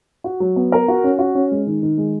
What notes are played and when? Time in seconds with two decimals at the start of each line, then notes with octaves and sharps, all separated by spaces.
0.24 F#4
0.40 F#3
0.56 B3
0.72 A#4
0.88 F#4
1.04 C#4
1.19 F#4
1.35 C#4
1.51 G#3
1.67 D#3
1.82 D#3
1.98 G#3